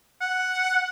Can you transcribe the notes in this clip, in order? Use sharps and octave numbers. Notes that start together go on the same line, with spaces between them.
F#5